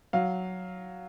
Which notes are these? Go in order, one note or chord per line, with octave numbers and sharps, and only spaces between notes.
F#3 F5